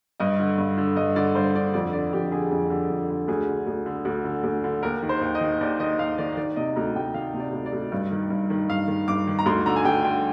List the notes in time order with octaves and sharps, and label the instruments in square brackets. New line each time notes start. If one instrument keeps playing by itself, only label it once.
[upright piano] G2 D#5
D3
G2
D3
G2 D#5
D3 D5
G2 C5
D3 D5
F2 D5
D3 D5
F2 G4
D3 G#4
F2 G#4
D3
F2
D3
D2 G#4
D3
D2
D3
D2
D3
D2
D3
D#2 A#4
D#3
C5
D#2
D#5
D#3
D#2 D5
D#3 D#5
D#2 F5
D#3 D5
D#3 D5
C3 D#5
D2 A#5
D2 G5
D#3 F5
C3
D5
D2
D5
D2
G2
D#3
G2
D#3
G2 F5
D#3
G2 D6
D#3
A#5
D2 C6
D3 A#5
G#5
D2 G5
D3 G5